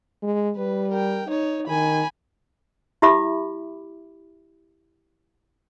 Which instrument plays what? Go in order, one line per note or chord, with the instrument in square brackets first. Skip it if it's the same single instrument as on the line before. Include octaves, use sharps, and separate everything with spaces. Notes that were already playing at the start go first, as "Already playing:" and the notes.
[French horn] G#3
[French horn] G3 [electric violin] B4
[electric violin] A#4 G5
D#4 C#5
[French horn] D#3 [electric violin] G#5 B5
[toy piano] E4 G4 E5 B5 D6